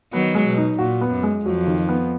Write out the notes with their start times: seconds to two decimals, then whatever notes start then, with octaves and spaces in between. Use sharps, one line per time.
0.13 D#3 F#3 B3
0.35 G#3
0.46 B2
0.57 D#4
0.79 A#2 F#4
1.01 B3
1.12 F#2
1.23 G#3
1.45 F2 F#3
1.67 D#3
1.89 B3